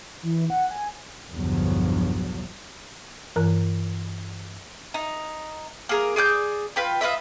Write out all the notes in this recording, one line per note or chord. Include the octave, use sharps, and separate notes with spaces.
E3
F#5
G#5
B1 E2 G2 D3 F3 F#3
G2 E3 A#4 A#5 F#6
D#4
A#3 G#4 A#4
G#4 D5 F#6 G6
F4 B4 G5
F4 B4 D#5 E5